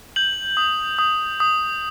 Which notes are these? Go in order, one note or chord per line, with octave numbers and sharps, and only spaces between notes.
G6 F#7
D#6
D#6
D#6